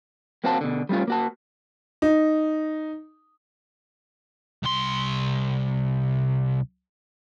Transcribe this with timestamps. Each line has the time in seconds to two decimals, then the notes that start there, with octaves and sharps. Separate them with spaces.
0.44 A#3 C4 F#4 C5 F5 A5
0.61 B2 D3
0.89 G3 A3 C#4 F4
1.08 A#3 F#4 A5
2.02 D#4
4.63 C2 C6